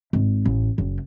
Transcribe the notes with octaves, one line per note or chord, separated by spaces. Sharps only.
G#1
A1
F#1